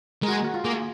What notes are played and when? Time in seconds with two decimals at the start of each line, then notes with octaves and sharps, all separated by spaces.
0.23 G#3 A#4
0.28 F#4
0.33 G#4
0.44 F#4
0.54 F4
0.64 A#3 G#4